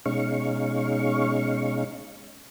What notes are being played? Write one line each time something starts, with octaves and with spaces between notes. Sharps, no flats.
B2 G#3 C#4 D#4 F5 C#6